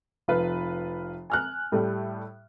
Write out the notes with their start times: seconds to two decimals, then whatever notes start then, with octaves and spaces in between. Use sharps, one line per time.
0.28 F1 F4 B4
1.30 G#5 F6 F#6
1.72 A2 G3 A3